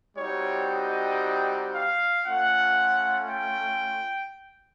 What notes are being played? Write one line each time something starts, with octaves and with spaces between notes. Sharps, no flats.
G3 C4 D#4 F#4 C#5
D#5
F5
A3 C#4 F4 F#5
G5